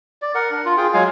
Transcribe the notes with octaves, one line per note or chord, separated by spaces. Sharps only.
D5
A#4 F#5
D4
F4
F4 G#4 G5
F#3 G#3 F5 G#5